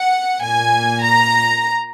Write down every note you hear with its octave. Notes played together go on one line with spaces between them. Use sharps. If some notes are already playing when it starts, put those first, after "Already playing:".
Already playing: F#5
A#2 A#3 G#5
A#5